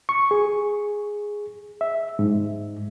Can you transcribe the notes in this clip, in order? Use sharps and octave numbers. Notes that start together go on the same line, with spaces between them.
C#6
G#4
E5
G#2